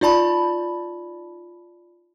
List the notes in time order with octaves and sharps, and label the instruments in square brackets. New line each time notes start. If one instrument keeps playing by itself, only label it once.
[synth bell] D#4 F4 D5 A5 B5